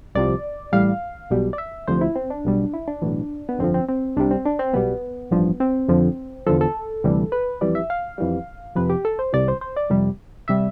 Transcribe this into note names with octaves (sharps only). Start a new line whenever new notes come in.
C2 C3 F3 D5
A1 A2 G3 F5
B1 B2 G3
D5
E5
D2 C3 F3 C5
E4
C4
D4
B1 B2 G3
E4
D4
B1 A2 E3
B3
G1 F2 D3 F3 C4
C4
C4
C2 C3 G3 D4
C4
D4
C4
B1 B2 G3 B3
A1 G2 F3
C4
F2 D3 F3
E2 D3 F3 A4
A4
D2 C3 E3 G3
B4
F2 E3 G3 D5
E5
F5
F2 E3 G3
F2 C3 F3 B4
G4
A4
C5
C2 C3 E3 D5
C5
C5
D5
F2 C3 G3
C3 G3 E5